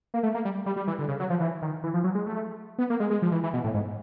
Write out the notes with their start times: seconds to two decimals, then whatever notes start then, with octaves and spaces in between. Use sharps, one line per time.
0.14 A#3
0.23 A3
0.34 A#3
0.45 G3
0.66 G3
0.76 G3
0.87 E3
0.99 D3
1.08 C#3
1.20 F#3
1.30 F3
1.40 E3
1.62 D#3
1.84 E3
1.94 F3
2.04 F#3
2.15 G#3
2.26 A3
2.78 B3
2.90 A#3
3.00 G#3
3.11 G#3
3.22 F3
3.32 E3
3.43 E3
3.54 B2
3.64 A2
3.74 G#2